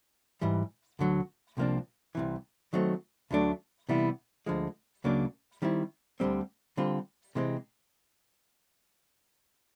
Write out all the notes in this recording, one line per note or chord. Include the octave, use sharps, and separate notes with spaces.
G#2 E3 G3
D2 D3 F#3
C2 C3 F3 A#3 D4
C2 C3 E3
D#3 F#3 A3 C4
D2 D3 F#3 A3 D4
C3 E3 G3 B3 E4
D2 D3 F3 G#3
C#2 C#3 F#3 A#3 D4
D#3 G3 C4 E4
D2 D3 G3 C4
D3 G3 C4 F4
C3 E3 G#3 C4